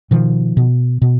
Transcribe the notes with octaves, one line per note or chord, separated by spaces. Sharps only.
B2 D#3 F3
B2
B2